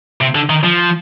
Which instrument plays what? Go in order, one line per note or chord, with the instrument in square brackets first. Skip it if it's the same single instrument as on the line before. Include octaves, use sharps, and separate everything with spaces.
[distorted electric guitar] C3
D3
D#3
F3